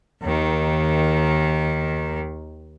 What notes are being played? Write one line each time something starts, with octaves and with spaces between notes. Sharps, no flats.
D#2 D#3